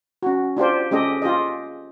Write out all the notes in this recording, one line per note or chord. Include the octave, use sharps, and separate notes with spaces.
C#4 F#4
D4 F4 G4 C5
G#3 C#4 G4 A4 D#5
F4 G4 G#4 D#5